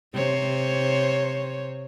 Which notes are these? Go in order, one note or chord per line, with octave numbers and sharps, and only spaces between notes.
C3 C5 C#5